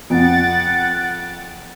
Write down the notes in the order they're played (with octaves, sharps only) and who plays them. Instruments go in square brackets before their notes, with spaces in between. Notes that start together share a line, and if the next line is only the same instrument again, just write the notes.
[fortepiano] F2 [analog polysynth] F#5 A6 D7